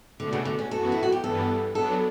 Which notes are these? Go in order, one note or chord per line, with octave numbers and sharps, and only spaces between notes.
B2 D3 A3 D4 F#4
C#3
D3
C#4
F#2 E3 B3 F#4 A4
E4
F#4
G4
G2 E3 G3 B3 A4
F#3 B3 D4 A4